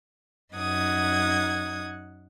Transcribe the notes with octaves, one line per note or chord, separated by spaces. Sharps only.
F#2 D#4 F#5 D#6 G#6